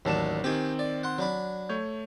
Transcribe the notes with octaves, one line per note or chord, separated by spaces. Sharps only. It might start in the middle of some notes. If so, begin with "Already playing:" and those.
A1 D#2 F#3 D4 A5 E7
D#3 C4 G4 G#5
D5
F#5 C6
F#3 D4 B5
A3 C#5 G6